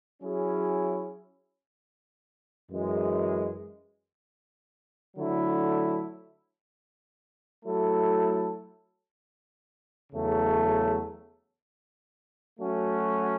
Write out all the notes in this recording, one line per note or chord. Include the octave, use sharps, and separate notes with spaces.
F#3 C#4 E4 G#4
F#2 E3 G#3
D3 F#3 A3 E4
F#3 A3 E4 A4
E2 C#3 F#3 A3
F#3 A3 C#4 F#4